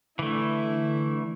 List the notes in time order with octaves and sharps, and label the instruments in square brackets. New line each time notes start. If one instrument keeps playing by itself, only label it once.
[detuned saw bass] D3 [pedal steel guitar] E3 A3 [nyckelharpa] E4